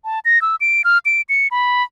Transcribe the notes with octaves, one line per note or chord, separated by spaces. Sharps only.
A5
A#6
E6
D7
F6
D7
C#7
B5